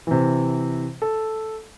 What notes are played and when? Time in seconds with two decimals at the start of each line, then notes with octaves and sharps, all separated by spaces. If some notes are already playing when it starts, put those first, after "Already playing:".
0.07 C3 E3
1.02 A4